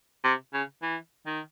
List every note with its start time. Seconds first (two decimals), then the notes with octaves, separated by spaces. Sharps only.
0.24 C3
0.54 C#3
0.83 E3
1.27 D#3